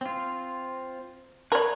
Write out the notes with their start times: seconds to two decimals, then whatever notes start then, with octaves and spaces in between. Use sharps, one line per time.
0.01 C4 F4
1.52 A#4 B4 C#5 D5